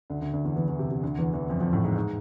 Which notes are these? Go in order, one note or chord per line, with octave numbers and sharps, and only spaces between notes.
D2 D3
D2 D3
D2 D3
E2 E3
E2 E3
E2 E3
C3
C3
D2 D3
E2 E3
E2 E3
F2 F3
F2 F3
A2 A3
G#2 G#3
G#2 G#3